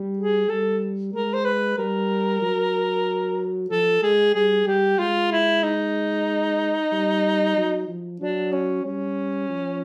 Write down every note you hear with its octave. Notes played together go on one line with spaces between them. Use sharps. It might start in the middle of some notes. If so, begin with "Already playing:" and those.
Already playing: G3
G#4
G3 A4
G#3 A#4
C5
B4
G3 A#4
F#3
F3 A4
G#3 G#4
G3 G#4
G3 G4
G#3 F4
E4
D#4
G3
F#3
F3
F#3 D4
C#4
G3 C#4
F3